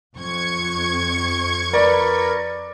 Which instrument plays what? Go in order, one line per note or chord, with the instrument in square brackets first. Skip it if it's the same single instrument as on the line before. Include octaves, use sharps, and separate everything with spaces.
[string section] F2 C#6 G#6
[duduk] A#4 [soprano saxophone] B4 [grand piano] D5